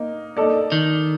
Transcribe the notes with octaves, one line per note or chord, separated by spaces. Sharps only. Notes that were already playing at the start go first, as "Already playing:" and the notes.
Already playing: A#3 D#4
A#3 D#4 A4 D5
D#3